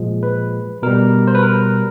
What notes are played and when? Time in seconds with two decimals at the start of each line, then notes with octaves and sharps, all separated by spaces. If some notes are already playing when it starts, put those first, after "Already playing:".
Already playing: A#2 F3 G#3
0.23 B4
0.82 B2 G3 A#4
1.27 C5
1.35 B4
1.43 A#4